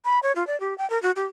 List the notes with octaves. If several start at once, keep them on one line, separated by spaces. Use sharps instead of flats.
B5
C#5
F4
D5
G4
G5
A#4
F#4
G4